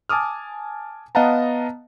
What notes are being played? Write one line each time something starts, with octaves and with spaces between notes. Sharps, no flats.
G#5 A5 D6 D#6 F6
B3 D#5 F5 F#5 A5 A#5